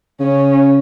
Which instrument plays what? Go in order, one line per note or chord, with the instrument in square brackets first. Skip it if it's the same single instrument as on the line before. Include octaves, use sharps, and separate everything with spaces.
[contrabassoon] C#3 [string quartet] C#4